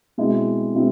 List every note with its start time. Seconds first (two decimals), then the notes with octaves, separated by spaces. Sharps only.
0.18 B2 G#3 C4 E4
0.74 B2 G#3 C4 E4